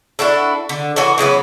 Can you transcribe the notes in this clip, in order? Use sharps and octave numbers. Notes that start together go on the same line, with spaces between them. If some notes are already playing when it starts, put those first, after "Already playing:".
D4 E4 F#4 A4
D3
E3 F#4 A4 C#5
C#3 E3 F#3 B3